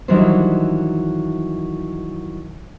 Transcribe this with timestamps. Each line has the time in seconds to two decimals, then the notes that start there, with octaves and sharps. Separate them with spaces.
0.08 D#3 E3 F#3 G3 D4 C5